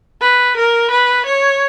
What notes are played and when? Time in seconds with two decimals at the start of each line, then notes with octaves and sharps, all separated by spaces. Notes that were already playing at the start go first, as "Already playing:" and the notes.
0.21 B4
0.57 A#4
0.91 B4
1.26 C#5